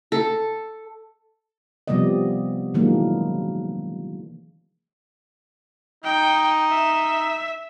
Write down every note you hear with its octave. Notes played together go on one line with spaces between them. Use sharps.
A4
C3 F3 G3 B3 D5 D#5
D#3 E3 F#3 G#3 A#3 D4
D#4 G5
E5